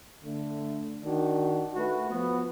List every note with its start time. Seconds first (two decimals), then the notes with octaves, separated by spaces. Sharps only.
0.25 D3 A3
1.03 D#3 D4 F#4
1.75 A3 F#4 B4
2.10 F3 B3